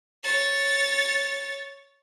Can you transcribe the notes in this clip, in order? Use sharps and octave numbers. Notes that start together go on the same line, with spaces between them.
C#5 A6